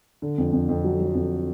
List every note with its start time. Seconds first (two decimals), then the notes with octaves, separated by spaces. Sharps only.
0.22 D3
0.38 F2
0.53 F2
0.69 F2
0.84 F#3
1.00 F#3
1.15 F2